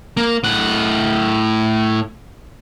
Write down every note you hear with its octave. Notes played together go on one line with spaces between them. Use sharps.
A#3
A2 F#5